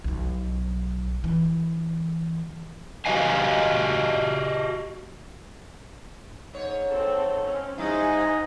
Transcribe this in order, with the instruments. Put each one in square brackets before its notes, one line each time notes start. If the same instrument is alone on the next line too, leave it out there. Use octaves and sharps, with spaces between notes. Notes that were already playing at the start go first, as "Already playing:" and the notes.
[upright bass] B1 F#3
E3
[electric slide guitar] F#4 G4 D#5 F5 G#5
[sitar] G#2 C#5
[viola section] C4 A4
C4 C#4
[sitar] G3 E4 [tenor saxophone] D#4 [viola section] C5 F#5 G#5